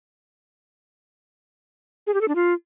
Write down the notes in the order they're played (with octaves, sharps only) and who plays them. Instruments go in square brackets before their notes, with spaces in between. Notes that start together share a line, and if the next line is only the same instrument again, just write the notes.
[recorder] G#4
G4
A4
D4
F4